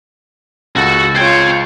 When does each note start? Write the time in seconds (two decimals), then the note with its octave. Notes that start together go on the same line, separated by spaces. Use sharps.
0.76 C#2 F#4 A4
1.16 F4 C5 C#5 G5 G#5